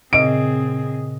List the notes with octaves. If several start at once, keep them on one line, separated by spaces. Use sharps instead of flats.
A#2 C#3 C4 G#4 D#5 D7